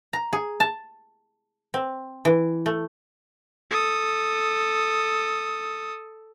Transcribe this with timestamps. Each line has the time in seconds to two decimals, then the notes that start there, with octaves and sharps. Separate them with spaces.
0.13 A#5
0.33 G#4
0.60 A5
1.74 C4
2.25 E3
2.66 A3
3.70 A4 D#6